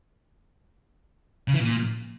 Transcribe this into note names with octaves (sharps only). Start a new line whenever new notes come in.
C#3
E3
A#2